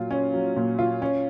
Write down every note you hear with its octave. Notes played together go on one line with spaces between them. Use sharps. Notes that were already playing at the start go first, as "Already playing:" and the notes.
Already playing: A#2 F#3 F4
C#4
F#3
A#2
F4
C#4